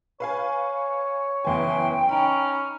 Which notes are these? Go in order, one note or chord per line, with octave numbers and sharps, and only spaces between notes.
B4 C#5 F5 G#5
F#1 E2 B4 E5 G5 G#5 C6
C#4 D#4 A#5 B5